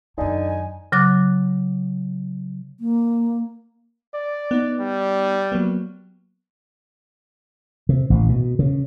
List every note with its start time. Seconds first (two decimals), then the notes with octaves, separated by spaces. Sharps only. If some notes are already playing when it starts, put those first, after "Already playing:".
0.18 F#2 D3 D#3 D#4 G#5
0.92 C#3 F#3 D6 F#6 A6
2.80 A#3
4.14 D5
4.51 B3 D#4
4.80 G3
5.52 F#3 A#3 B3
7.89 C3
8.10 A1
8.29 B2
8.59 C#3